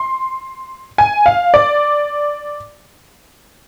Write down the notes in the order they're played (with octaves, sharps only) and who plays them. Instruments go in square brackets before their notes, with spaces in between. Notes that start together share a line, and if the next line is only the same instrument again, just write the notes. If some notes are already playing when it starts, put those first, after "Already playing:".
Already playing: [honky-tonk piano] C6
G#5
F5
D5